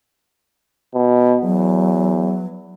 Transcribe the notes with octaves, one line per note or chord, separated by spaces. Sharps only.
B2
E2 F#3